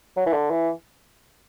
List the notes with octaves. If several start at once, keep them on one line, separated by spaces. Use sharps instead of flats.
F#3
E3
D3
E3